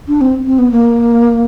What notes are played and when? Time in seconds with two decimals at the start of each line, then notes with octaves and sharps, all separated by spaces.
0.08 D4
0.21 C4
0.46 C4
0.58 B3
0.72 A#3